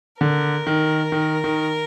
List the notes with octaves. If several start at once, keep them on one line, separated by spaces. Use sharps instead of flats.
D3 A#4
D#3
D#3
D#3